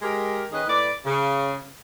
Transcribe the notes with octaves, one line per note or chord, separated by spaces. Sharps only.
G#3 G4 A#4
D#3 C#4 G#4 B4 D#5
A2 B4 D5
C#3